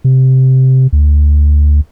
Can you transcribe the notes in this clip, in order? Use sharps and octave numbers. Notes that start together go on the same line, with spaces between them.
C3
D2